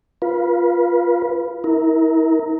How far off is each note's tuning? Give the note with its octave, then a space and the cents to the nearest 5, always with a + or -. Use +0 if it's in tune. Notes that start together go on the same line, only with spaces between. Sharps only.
F4 +0 B4 -25
E4 -35 A#4 +0